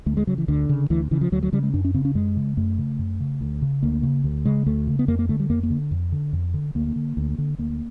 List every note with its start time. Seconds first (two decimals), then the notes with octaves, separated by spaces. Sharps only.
0.06 D2 A3
0.17 G#3
0.27 C#3 F#3
0.38 E3
0.48 D2 D3
0.69 C#3
0.90 D2 E3
1.11 C#3 E3
1.21 F3
1.32 D2 F#3
1.43 F#3
1.53 C#3 G3
1.63 G#3
1.74 F#2 D4
1.85 C#4
1.94 C#3 C4
2.05 C#4
2.15 F#2 G#3
2.37 C#3
2.57 F#2 A3
2.78 C#3
2.99 F#2
3.20 C#3
3.41 D2
3.62 C#3
3.82 D2 A#3
4.03 C#3
4.24 D2
4.45 C#3 G#3
4.66 D2 A3
4.87 C#3
4.99 B3
5.08 F2 A#3
5.19 A#3
5.29 D3 A3
5.40 G3
5.50 F2 A#3
5.63 A#3
5.70 D3
5.91 F2
6.12 D3
6.33 F2
6.54 D3
6.75 D2 A#3
6.96 D3
7.17 D2
7.38 D3
7.58 D2 A#3